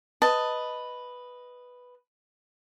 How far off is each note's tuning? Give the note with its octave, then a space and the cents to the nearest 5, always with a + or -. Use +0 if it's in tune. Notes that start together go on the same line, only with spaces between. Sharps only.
B4 +0 D#5 +0 A5 +10